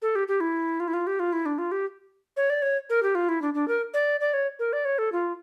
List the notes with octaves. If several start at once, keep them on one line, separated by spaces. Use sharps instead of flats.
A4
G4
G4
E4
F4
E4
F4
G4
F4
E4
D4
F4
G4
C#5
D5
C#5
A#4
G4
F4
E4
D4
D4
A#4
D5
D5
C#5
A#4
D5
C#5
A4
F4